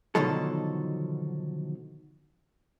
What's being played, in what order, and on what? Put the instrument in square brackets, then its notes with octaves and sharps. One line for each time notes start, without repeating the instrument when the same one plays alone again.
[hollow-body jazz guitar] B2 D3 D#3 F3 F#3 A4